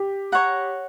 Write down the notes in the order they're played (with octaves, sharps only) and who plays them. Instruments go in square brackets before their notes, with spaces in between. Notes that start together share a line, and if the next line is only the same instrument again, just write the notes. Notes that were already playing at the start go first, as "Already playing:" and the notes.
Already playing: [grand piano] G4
[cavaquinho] C#5 F#5 A#5